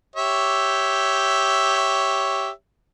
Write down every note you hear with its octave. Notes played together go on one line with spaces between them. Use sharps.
G4 C#5 E5